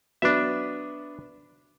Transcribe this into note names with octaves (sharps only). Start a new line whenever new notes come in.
F#3 B3 D4 B4 E5